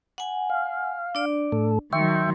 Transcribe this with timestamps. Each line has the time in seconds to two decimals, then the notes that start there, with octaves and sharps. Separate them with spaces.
0.18 F#5 G#5
0.50 F5
1.15 D4 D5
1.52 A2 A4
1.93 D#3 F#3 E5 G5 C6 C#6